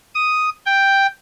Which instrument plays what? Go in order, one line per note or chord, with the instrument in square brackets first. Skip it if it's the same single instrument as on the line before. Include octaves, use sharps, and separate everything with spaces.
[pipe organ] D#6
G5